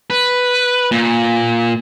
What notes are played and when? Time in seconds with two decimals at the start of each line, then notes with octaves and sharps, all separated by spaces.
0.10 B4
0.91 A#2